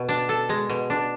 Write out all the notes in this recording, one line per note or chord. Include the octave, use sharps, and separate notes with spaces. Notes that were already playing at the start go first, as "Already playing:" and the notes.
Already playing: B2
D4
A4
G#3
B2
D4